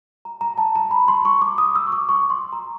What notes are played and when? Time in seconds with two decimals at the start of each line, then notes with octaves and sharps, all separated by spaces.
0.25 A#5
0.41 A#5
0.58 A5
0.75 A#5
0.91 B5
1.08 C6
1.25 C#6
1.42 D6
1.58 D#6
1.76 E6
1.87 C#6
1.92 D6
2.09 C#6
2.30 C6
2.52 A#5